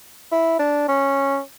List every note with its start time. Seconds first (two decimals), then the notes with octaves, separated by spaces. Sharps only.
0.32 E4
0.59 D4
0.88 C#4